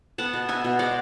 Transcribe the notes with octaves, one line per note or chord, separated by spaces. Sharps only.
B3 F#5 A5
B2
B3 E5 G#5
B2
G#3 D5 F#5